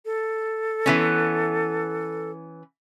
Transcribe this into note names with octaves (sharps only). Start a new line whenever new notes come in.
A4
E3 B3 C#4